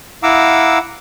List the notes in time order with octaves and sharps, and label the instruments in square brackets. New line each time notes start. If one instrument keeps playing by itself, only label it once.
[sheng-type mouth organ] E4 F5 F#5 A#5 D6 E6